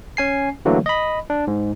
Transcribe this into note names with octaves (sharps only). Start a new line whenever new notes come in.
C#4 G#5 C7
D3 E3 F#3 A3 A#3
D#5 B5
D4
G#2